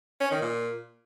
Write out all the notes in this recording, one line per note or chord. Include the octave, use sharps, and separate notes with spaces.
C#4
D#3
A#2